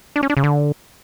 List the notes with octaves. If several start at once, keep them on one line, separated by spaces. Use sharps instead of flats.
D4
C#4
D4
C#3
D3